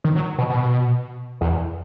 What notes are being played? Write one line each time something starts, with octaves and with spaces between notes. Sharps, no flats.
D#3
F#3
B2
B2
E2